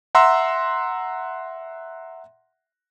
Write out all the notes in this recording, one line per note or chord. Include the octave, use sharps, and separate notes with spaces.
E5 F#5 A#5 C6 E6